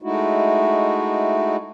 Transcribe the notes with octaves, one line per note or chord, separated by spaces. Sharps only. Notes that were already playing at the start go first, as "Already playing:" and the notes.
G#3 A3 D#4 E4 F#4